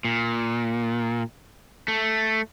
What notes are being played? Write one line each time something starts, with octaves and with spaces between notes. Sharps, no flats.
A#2
A3